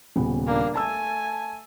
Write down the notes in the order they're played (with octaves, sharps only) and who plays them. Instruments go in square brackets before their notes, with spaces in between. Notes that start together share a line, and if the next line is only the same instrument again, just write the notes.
[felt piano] D#1 C#3 B3
[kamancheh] A#3 D4
[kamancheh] A3 G#5 [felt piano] A5 E6